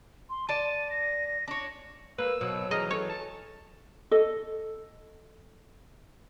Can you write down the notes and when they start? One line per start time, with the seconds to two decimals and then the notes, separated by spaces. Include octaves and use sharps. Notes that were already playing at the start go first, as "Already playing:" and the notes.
0.30 C6
0.49 D5 A5 D#7
0.90 A#6
1.48 D4 C#5
2.18 A#3 B4 E6
2.41 B2 F#3
2.71 E3 G#4 D#5 A#5 F6
2.91 A4 C#5
3.09 A5
4.11 A4 D#5